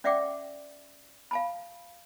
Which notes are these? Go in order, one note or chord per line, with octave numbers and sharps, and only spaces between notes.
C#4 D5 E5 F#5 G5 D6
F5 A5 B5